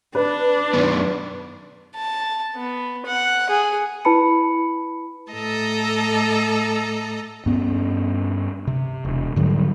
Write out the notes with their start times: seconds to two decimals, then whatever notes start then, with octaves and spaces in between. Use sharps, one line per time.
0.15 D4 B4
0.73 F#2 D#3 B3
1.96 A5
2.55 B3
3.06 F#5
3.50 G#4
4.05 E4 B4 A5 B5 C#7
5.32 A2 A4 D#5 A5 A#5
7.46 G2 B3 C#4
8.67 C3
9.05 E1
9.36 G#2 D3 F#3 G3